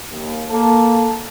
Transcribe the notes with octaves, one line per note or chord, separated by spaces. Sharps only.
D#2
A#3 A4 A5